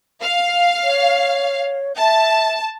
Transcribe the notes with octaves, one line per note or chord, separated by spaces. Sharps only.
F5
C#5
E5 A5